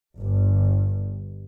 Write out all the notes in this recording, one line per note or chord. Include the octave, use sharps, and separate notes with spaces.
G1 G2